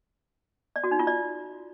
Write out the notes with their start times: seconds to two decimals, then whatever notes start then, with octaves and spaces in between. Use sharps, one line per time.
0.76 D5
0.84 F#4
0.91 D#4
0.99 F4
1.07 D5